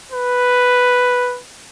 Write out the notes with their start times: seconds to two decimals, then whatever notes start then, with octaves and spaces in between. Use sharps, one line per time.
0.12 B4